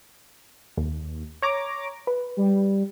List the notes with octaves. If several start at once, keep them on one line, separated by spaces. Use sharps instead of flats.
D#2
C#5 A#5 D6
B4
G3